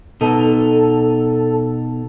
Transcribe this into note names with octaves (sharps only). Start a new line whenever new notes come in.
B2 D#4 A4